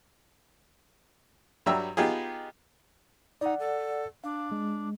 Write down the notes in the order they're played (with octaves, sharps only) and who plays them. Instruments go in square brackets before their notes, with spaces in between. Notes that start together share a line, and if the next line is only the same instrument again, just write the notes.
[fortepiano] G2 F#3 G3 E5 A#5 E6
B3 D#4 F4 G4 G#4
[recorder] D#4 [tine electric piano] D5 F#5
[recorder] A4
[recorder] D4 [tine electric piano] F5
[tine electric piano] G#3